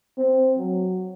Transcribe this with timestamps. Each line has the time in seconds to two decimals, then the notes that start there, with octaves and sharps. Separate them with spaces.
0.18 C4
0.58 F#3